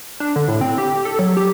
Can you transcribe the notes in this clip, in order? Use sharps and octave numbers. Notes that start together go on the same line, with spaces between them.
D4
D3
A2
C4
G4
A4
F#3
G4